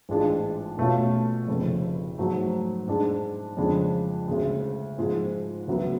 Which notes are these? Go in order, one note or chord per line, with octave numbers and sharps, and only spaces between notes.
A1 G#2 G#3 D4 F4
B2 A3 C#4 F4
F1 F2 C#3
G#2 F#3 A3
G#2 G#3 D4
F2 C#3 G#3 D4
D2 C#3 G#3
G#2 F3 G#3
D2 C#3 F#3 B3